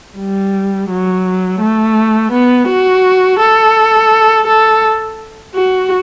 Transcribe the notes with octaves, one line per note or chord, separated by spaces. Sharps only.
G3
F#3
A3
B3
F#4
A4
A4
F#4